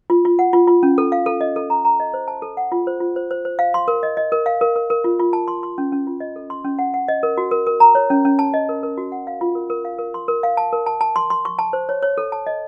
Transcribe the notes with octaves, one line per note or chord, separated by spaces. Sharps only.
F4
F4
F#5
F4
F4
C#4
A4
F5
A4
D#5
A4
A#5
A#5
D#5
C5
A5
A4
F#5
F4
C5
F4
C5
C5
C5
F5
C6
A#4
D#5
D#5
A#4
F5
A#4
A#4
A#4
F4
F4
A5
C6
C6
C#4
C#4
F4
D#5
A4
C6
C#4
F#5
F#5
D#5
A#4
F#4
A#4
A#4
A#5
C#5
C#4
C#4
A5
D#5
A#4
A#4
F#4
F#5
F5
F4
A#4
A#4
F5
A#4
C6
A#4
F5
A5
A#4
A5
A5
C6
C6
C#6
A5
C5
C#5
C#5
A4
A5
D#5